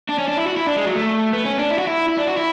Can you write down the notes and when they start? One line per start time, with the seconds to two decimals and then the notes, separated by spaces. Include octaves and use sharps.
0.09 D4
0.19 C#4
0.28 D4
0.38 E4
0.47 F#4
0.57 E4
0.67 D4
0.76 G#3
0.85 F#3
0.95 A3
1.33 B3
1.45 C#4
1.58 D4
1.71 E4
1.78 F#4
1.87 E4
2.09 E4
2.18 D4
2.28 F#4
2.37 E4